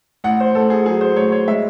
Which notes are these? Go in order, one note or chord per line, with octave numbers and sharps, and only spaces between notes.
A1 F#5
C5
A1 A4
G#4
F#3 G#4
C5
A1 C#5
C#5
G#3 E5